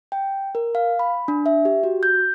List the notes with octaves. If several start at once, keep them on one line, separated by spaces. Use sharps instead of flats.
G5
A#4
F5
B5
D4
E5
G4
F#4
G6